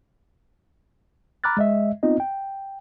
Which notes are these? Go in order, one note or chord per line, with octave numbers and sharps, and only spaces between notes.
A#5 B5 D6 F6 F#6 A6
G#3 D#5 E5
B3 C4 D#4 F4 D#5
G5